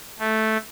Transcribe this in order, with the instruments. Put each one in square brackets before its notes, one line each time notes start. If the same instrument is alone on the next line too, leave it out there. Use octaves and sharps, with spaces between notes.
[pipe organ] A3